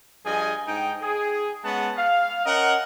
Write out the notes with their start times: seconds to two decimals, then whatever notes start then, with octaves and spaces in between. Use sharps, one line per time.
0.25 G2 F3 G#4 D#5 G#5
0.67 G#2 D#4 G5
1.02 G#4
1.63 G#3 B3 C#4 F#5 A5
1.97 F5
2.45 C#4 A#4 D#5 F#5